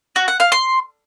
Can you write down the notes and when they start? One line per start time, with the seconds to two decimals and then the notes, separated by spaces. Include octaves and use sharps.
0.16 F#4
0.28 F#5
0.40 F5
0.52 C6